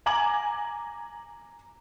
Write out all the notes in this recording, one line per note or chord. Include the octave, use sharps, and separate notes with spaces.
G#5 A#5 D6 G#6 F#7